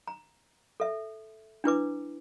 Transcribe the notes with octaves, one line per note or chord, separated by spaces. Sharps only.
A#5
A4 E5
D4 E4 B4 D6